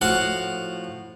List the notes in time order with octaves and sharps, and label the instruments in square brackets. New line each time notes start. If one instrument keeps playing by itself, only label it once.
[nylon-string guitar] A2 F3 A3 [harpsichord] F#4 F5 F#5